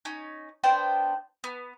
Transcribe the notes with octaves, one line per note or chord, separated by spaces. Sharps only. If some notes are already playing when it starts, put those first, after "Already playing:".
C#4 D#4
B3 D4 C5 G5
B3